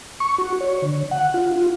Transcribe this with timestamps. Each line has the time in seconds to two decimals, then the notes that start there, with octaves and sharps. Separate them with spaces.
0.20 C#6
0.38 F#4
0.61 C#5
0.82 D3
1.11 F#5
1.34 F4
1.52 F4